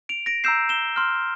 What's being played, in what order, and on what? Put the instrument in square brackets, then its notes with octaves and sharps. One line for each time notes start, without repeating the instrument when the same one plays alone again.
[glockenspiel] D7 F7
A#6 D7
A#5 E6 G6 C7 E7
E7 G7
C6 F6